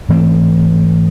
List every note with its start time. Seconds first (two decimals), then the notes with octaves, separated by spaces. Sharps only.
0.09 G#2 E3 A3 C4